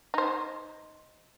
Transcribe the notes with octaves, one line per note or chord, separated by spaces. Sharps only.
D#4 C5